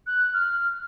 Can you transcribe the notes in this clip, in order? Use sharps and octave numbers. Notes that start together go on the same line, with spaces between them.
F#6
F6